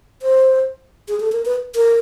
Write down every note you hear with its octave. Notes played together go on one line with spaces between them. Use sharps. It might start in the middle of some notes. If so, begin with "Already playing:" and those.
C5
G#4
A4
A#4
B4
A#4